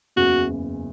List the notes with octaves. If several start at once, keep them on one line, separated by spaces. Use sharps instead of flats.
F#1 E2 C#3 F#4